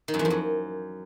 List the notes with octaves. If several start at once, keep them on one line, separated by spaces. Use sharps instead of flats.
D#3
F#2
E2
F2
F#2